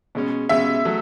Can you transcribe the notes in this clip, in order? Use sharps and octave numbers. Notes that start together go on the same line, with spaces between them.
B2 G#3 C#4
B2 G#3 C#4 E5
F#3 A3